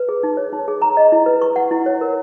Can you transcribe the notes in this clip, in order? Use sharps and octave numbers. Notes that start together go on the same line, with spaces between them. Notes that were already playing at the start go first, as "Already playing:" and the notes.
Already playing: B4
G#4
D#4
C#5
D#4
G#4
A#5
D#5
E4
B4
C#6
F#5
E4
C#5
A#4